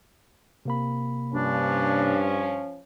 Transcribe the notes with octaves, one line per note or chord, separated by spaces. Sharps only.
C3 A#3 B5
G2 F3 C#4 D4